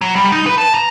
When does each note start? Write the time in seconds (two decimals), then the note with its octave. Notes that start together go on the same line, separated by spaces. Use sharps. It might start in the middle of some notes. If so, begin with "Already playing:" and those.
0.01 F#3
0.16 G3
0.32 D#4
0.46 B4
0.58 A5
0.74 A#5